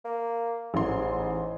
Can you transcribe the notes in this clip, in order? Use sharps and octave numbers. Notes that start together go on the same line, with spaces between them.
A#3
A1 G#2 C6